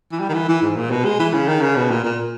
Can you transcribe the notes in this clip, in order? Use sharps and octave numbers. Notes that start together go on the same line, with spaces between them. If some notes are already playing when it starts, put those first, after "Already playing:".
E3
G3
D#3
E3
E3
G#2
A#2
B2
G#3
E3
C#3
D#3
C#3
B2
A#2
A#2